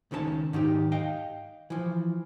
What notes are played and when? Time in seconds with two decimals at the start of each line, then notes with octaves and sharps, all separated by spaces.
0.11 C#2 D#3 C#4 A#4 A5
0.53 G#2 D#3 D#4 G4
0.92 D#5 F5 G5
1.70 E3 F3